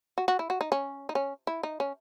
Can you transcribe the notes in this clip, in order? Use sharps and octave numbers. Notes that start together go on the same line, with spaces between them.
F#4
F#4
E4
F#4
D#4
C#4
D#4
C#4
E4
D#4
C#4